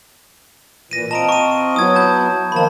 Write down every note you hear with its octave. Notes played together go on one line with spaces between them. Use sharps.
A#2 E3 A#6 D#7
C4 F4 D#5 A5 A#5 D7
C#6 D#7
F#3 B3 E4 D#6 G#6
A5 G6
D#3 F3 A#3 A5 B5